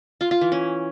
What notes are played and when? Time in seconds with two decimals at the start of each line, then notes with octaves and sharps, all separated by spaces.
0.21 F4
0.31 F4
0.41 E3
0.52 C#4